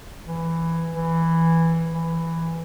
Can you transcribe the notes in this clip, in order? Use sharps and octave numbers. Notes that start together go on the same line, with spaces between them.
E3
E3
E3